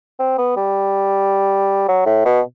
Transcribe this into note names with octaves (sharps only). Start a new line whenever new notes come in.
C4
B3
G3
F#3
A2
B2